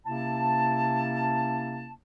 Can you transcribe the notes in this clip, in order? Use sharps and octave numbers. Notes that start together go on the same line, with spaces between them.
C3 A#3 C#4 E4 A5